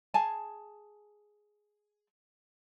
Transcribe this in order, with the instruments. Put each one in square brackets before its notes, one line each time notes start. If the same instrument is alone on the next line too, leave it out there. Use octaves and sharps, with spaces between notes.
[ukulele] G#4 G#5 A5